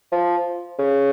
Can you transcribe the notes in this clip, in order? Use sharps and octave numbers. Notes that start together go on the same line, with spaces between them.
F3
C#3